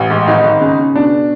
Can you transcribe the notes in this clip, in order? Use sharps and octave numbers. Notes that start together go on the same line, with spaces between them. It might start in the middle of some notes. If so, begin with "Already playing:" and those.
Already playing: A1
G#2
G#1 D#4
G#1
C#3
C#3
B2 D4